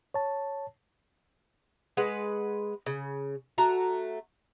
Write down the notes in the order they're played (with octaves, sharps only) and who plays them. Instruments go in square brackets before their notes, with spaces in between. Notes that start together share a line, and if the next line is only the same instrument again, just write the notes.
[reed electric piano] C#5 A5
[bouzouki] G#3 B4 F#5
C#3
A3 F#4 A#5